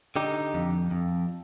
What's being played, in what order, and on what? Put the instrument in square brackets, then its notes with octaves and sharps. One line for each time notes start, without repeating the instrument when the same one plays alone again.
[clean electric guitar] D3 D#4 G4
F2
F2